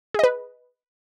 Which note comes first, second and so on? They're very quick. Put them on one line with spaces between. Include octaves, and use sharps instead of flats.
G#4 D#5 B4